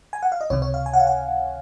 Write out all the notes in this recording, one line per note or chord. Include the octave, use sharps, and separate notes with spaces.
G#5
F#5
F5
D#5
C#2 C3 D#3 C#5
C#5
F5
G#5
F#5
F5
F#5